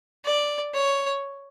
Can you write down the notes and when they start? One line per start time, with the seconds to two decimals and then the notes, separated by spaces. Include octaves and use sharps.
0.25 D5
0.74 C#5